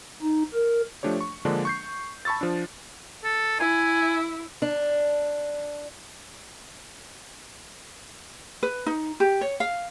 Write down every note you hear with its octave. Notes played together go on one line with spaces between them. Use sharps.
D#4
A#4
F3 A3 D4 G4 C#5
C#6
D3 F3 G#3 A#3 D4
C#6 G6 C7
A5 B5 C#6 E6 A6
F3 D4
A4
E4 G#5
D4
B4
D#4
G4
C#5
F5